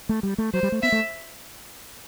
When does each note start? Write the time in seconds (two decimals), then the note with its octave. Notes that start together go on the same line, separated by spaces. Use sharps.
0.09 A3
0.23 G3
0.38 A3
0.53 F#3 C5
0.63 G3
0.72 A3
0.83 B3 E5
0.92 A3